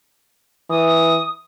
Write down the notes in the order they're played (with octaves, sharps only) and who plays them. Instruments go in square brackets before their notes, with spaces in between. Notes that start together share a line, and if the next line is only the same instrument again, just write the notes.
[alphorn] E3 [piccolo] D#6